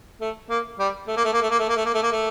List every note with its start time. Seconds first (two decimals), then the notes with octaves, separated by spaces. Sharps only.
0.21 A3
0.49 A#3
0.79 G3
1.07 A3
1.16 A#3
1.24 A3
1.33 A#3
1.42 A3
1.50 A#3
1.59 A3
1.68 A#3
1.76 A3
1.85 A#3
1.94 A3
2.03 A#3
2.12 A3